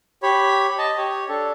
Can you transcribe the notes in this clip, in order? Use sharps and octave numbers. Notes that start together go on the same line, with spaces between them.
G4 C#5 B5
D#5 A5
G4 C#5
D4 A4